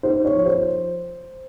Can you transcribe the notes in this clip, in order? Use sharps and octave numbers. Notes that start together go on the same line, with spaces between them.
D#4 C5
C#5
F3
C5